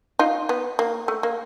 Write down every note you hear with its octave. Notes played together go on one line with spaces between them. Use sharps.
D#4 F4
B3
A#3
A3
A#3